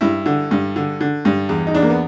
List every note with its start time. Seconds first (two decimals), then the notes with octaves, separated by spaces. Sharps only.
0.01 G2 E4
0.26 D3
0.51 G2
0.76 D3
1.01 D3
1.25 G2
1.49 E2
1.67 D#4
1.74 E2 D4
1.82 A#3
1.90 B3